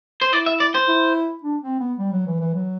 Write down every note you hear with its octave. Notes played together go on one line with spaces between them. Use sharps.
C5
E4 D5
E5
D5
C5
E4
D4
C4
B3
G3
F#3
E3
E3
F#3